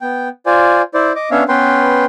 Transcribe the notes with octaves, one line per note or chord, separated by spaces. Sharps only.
B3 G5
F4 C5 D5 G#5
E4 C5 D5
D#5 D6
B3 C#4 D4 C#5 E5 F5
B3 C#4 B4 G5 C6